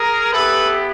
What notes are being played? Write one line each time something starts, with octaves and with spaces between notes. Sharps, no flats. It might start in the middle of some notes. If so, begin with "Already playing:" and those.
Already playing: G#4 A#4
B3 E4 G4 A4 B4